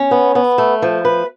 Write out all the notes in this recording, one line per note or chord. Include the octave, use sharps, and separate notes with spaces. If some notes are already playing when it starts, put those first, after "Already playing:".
Already playing: C#4
B3
B3
A3
F3
B4